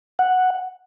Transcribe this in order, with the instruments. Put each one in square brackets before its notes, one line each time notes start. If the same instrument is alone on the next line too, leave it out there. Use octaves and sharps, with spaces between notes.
[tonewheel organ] F#5